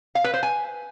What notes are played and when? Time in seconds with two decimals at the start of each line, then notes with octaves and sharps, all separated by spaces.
0.15 F5
0.24 B4
0.34 C5
0.43 G#5